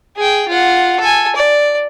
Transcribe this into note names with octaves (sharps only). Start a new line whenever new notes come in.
G#4 G5
F4 F#5
A4 G#5
D5